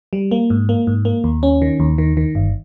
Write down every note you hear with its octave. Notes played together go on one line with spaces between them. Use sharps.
G3
A#3
G#2
A#3
G#2
A#3
D#2
C#4
D#3
D#2
D#3
D#3
G1